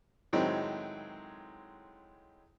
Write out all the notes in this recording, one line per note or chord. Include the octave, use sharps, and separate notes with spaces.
A2 D#3 F#3 G#3 C4